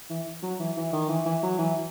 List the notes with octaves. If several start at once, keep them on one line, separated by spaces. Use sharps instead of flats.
E3
F#3
E3
E3
D#3
E3
E3
F#3
E3